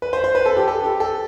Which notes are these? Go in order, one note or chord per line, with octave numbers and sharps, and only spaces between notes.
B4
C5
C5
B4
A4
G4
A4
G4
A4